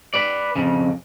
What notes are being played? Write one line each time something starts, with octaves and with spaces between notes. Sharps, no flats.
B4 D5
F2 C#3